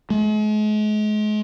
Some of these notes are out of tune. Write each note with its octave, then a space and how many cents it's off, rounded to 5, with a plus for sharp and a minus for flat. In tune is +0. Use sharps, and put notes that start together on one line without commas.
G#3 +40